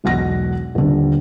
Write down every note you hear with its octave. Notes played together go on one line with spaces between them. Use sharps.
E1 B1 F#5 A#6
D#1 D3